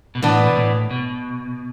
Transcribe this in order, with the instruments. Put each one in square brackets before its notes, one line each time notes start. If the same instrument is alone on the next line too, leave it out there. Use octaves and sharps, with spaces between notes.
[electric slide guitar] B2
[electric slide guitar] A2 [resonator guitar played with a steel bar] E3 B3 D4
[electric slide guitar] B2
A2
B2